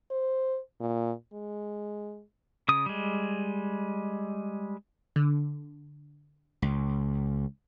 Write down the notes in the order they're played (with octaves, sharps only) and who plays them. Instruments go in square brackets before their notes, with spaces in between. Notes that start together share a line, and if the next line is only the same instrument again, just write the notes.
[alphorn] C5
A#2
G#3
[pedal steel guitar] C#3 D#6
G3 G#3
[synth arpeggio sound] D3
[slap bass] C#2